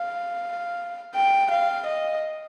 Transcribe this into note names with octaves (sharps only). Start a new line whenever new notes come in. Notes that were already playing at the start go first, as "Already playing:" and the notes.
Already playing: F5
G5
F5
D#5